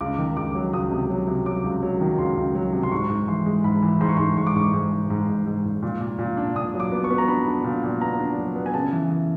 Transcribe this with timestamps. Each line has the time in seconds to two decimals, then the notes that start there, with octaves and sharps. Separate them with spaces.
0.01 C#2 D6
0.19 D#3
0.37 C#2 D6
0.55 F#3
0.73 C#2 D#6
0.91 C3
1.10 F#3
1.28 C3
1.46 F#3 D6
1.64 C#2
1.83 F#3
2.01 D#3
2.18 C#2 C6
2.37 C#2
2.55 F#3
2.73 C3
2.83 C6
2.92 G#2 C#6
3.10 G#2
3.28 E3 C6
3.46 G#3
3.64 G#2 B5
3.82 E3
4.01 G#2 C6
4.09 C#6
4.17 G#2 C6
4.37 G#2 C#6
4.47 D6
4.55 G#2 C#6
4.74 G#2
4.92 G#2
5.10 G#2
5.28 G#2
5.46 G#2
5.65 G#2
5.83 A#2
6.01 A#2
6.19 A#2
6.37 D4
6.55 A#2 D#6
6.74 F#3
6.80 D6
6.92 B3
7.04 C#6
7.11 B3
7.18 A#5
7.28 D4 B5
7.47 D4
7.64 A#2
7.83 A#2
8.01 B3 A#5
8.19 D4
8.38 F#3
8.56 B3
8.66 G#5
8.74 C#3 A5
8.92 E3
9.10 E3